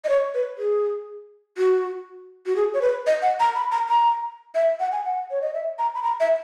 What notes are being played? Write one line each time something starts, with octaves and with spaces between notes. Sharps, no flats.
D#5
C#5
B4
G#4
F#4
F#4
G#4
C#5
B4
D#5
F#5
A#5
B5
A#5
A#5
E5
F#5
G#5
F#5
C#5
D#5
E5
A#5
B5
A#5
E5